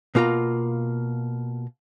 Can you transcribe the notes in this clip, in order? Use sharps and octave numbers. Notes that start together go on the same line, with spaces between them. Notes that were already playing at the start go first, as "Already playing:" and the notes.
B2 A#3 F4 D5 A#5